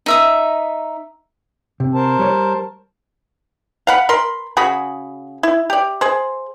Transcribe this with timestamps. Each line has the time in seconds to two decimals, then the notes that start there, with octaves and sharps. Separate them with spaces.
0.06 D#4 E5 D#6
1.80 C3
1.94 A#4 C5 A5
2.19 G3 C#5
3.87 F5 F#5 B5
4.09 A#4 B5 C6
4.57 C#3 F#4 G#4 B5
5.43 E4
5.70 G4 D5
6.01 G#4 C5